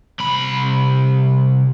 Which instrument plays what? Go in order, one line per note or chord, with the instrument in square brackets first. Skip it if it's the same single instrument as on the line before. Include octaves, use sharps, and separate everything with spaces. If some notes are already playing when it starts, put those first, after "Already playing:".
[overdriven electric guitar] C2 B5